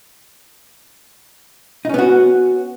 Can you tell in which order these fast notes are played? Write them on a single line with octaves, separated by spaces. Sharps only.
D#4 C#4 B3 F#4